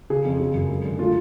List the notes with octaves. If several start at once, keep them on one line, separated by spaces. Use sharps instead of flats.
C#3 G#4
F2
C#3
F#2
G#3
D3
A3 F4